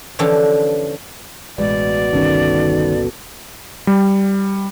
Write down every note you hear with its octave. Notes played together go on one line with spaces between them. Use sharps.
D3 E3 F3 C#4 G4 A4
A1 B2 G#3 B3 D5
G1 C2 D#3 C#4 A4
G3